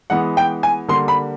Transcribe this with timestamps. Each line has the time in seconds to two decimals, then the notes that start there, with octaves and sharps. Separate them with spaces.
0.10 E3 G#3 B3 F#5
0.37 G5
0.63 G#5
0.88 D3 G3 A#3 C6
1.08 B5